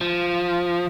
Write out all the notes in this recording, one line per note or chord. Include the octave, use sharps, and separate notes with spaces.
F3